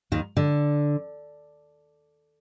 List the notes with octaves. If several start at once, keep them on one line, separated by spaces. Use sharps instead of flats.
D#2 D#3
D3